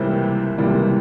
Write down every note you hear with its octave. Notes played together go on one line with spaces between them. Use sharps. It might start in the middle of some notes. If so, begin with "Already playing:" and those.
Already playing: C#2 C3 E3 G3 A#3 C5 E5
C#2 C3 E3 G3 A#3